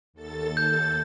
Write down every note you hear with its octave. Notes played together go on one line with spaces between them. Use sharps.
D#2 A4 A6
G6